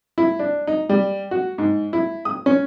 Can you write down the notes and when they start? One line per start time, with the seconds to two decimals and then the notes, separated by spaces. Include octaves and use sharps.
0.18 E4
0.39 D4
0.67 D#4
0.89 G3
1.31 F#4
1.58 G#2
1.93 E4
2.25 D#6
2.46 C#4